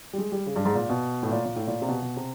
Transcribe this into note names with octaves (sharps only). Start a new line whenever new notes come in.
G3
G#3
G3
C#3
G2
G#2
A#2
B2
A2
A#2
A#2
A2
A#2
C3
B2
B2
C3